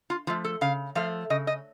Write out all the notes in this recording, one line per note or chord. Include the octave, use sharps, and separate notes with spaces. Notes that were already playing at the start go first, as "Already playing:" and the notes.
F4
F3 A3 F4
A4
C#3 F5
F3 A3 F5
C#3 D#5
D#5